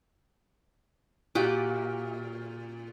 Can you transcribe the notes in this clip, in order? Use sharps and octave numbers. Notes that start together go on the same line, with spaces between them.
A#2 F#4 G4 D6